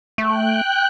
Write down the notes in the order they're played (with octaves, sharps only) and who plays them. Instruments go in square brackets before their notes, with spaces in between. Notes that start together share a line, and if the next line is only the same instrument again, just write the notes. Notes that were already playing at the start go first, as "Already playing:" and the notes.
[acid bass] A3 [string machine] G5 F#6